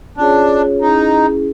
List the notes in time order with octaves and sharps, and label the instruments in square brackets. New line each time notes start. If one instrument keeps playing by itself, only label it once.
[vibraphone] C#4 F4 G#4 C#5 [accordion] D4
[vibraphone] C#4 E4 G#4 [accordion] D#4